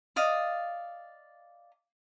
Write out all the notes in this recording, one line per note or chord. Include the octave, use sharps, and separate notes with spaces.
D5 D#5 F5